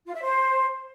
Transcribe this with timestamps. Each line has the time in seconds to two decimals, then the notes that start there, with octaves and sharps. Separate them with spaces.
0.06 F4
0.14 E5
0.22 C5